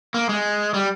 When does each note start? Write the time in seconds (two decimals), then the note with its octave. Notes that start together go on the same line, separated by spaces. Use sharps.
0.14 A#3
0.29 G#3
0.74 G3